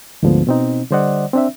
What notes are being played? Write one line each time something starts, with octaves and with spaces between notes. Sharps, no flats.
D2 G#2 D3 F3 B3
B2 C4 D#4
D3 G3 C5 D5 D#5 F#5
C4 D4 E5